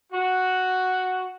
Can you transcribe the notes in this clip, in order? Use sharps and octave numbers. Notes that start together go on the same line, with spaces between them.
F#4